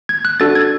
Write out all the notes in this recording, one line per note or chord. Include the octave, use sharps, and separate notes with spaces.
G#6
F#6
D4 F#4 A4 A6
G#6